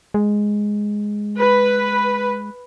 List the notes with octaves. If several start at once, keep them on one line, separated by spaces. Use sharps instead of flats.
G#3
B4